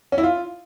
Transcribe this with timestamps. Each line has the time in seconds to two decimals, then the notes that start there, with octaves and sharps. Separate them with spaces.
0.12 C#4
0.18 E4
0.23 F4